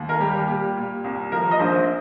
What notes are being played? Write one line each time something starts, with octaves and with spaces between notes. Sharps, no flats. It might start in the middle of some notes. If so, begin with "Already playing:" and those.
Already playing: D#2
A#4
G3 G4
A#2 G4
A#2
C2
F3 A#4
D#5
A#1 C5